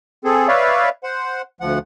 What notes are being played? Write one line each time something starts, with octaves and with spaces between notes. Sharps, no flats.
C4 G#4 A4
B4 C#5 D5 E5 F5
C5 F#5
D2 F3 F#5